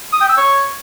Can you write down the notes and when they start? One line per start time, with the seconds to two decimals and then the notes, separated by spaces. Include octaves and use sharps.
0.13 D#6
0.21 G5
0.29 E6
0.37 C#5